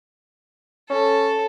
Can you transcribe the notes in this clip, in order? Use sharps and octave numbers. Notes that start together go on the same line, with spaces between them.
C#4 A4